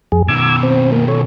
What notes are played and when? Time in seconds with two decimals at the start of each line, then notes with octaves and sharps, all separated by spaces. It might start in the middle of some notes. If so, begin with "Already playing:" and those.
0.12 F2 G#4
0.28 B2 D#3 D6 E6 G#6
0.63 C4
0.92 A#3
1.08 A4 C#5